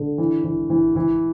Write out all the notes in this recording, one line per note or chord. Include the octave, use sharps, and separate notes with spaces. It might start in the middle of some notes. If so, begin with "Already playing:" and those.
Already playing: D3
E3
E3
E3
E3